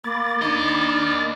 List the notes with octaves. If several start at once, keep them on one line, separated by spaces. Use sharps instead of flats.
A#3 B5 D6 A6
A#3 D4 D#4 D#5